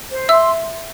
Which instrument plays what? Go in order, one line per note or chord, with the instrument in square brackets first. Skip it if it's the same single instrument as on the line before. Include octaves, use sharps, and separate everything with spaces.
[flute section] C5
[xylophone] E5 E6 [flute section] C6